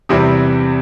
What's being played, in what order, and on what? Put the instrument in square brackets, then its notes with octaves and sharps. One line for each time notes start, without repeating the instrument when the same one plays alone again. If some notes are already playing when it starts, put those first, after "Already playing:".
[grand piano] E2 C3 G3 C4 E4